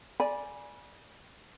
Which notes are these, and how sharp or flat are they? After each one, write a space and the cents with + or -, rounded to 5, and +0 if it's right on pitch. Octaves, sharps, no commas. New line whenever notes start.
D5 +0 G#5 +0 B5 -30